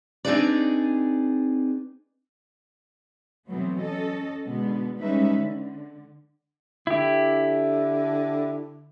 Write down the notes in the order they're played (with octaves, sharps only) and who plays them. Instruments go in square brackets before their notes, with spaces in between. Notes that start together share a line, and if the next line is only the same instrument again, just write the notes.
[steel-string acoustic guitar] C4 D4 D#4 G#4 B4 D5
[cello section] B2 E3 F#3 A3 B3 C4
C#4 A4 D#5
B2 D3 G#3 B3
G3 G#3 C#4 D#4 B4 E5
D3
[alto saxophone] D3 [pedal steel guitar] E4 G4